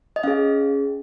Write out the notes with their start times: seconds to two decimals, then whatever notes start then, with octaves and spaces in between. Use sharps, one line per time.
0.16 D#5
0.23 C#4 G#4 F5